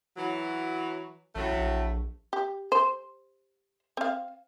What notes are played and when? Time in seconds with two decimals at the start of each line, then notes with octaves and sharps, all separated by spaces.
0.17 E3 F#3
1.35 A1 A2 F#3 A3
1.52 A#1
2.33 G4
2.72 C5
3.97 C4 F5